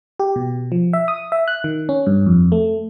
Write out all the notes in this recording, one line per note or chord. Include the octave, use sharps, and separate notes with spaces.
G4
B2
F3
E5
D#6
E5
F#6
D#3
C#4
G2
F2
A3